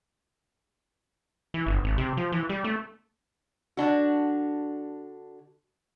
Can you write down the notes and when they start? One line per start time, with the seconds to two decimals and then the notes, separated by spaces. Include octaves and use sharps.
1.54 E3
1.67 G1
1.84 G#1
1.98 C3
2.17 F3
2.32 E3
2.49 G3
2.64 A3
3.77 D3 D4 F#4